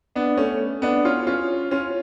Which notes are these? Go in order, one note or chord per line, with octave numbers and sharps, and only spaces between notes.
B3 D4
A3 C#4
B3 D4
C#4 F4
C#4 F4
C#4 F4